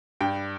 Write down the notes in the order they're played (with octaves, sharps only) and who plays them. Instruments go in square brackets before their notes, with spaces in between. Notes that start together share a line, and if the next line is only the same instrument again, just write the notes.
[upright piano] G2 G5